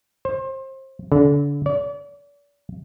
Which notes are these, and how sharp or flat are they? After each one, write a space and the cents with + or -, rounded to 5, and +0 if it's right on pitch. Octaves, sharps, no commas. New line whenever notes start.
C5 +30
D3 -35
D5 -40